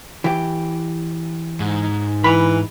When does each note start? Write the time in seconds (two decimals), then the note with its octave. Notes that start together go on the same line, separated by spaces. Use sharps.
0.24 E3 G4
1.60 G#2
2.24 E3 B5